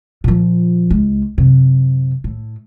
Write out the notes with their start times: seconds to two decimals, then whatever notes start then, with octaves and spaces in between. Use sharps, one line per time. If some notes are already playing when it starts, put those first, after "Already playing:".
0.24 A#2 F3
0.90 C#2 G#3
1.38 F#2 C3
2.24 A2